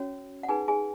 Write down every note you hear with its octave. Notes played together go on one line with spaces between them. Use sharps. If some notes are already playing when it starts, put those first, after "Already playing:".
Already playing: C#4 F#4 C#5
F#5
D#4 G#4 B4 G#5
G#4 G#5